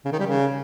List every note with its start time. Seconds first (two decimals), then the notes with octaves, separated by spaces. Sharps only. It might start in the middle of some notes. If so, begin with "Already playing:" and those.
0.05 C#3
0.12 D#3
0.19 G3
0.27 C#3